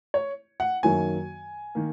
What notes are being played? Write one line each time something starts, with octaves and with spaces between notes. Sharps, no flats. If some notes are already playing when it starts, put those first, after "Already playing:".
C#5
F#5
F#2 D#3 F#3 A#3 G#5
D#3 A#3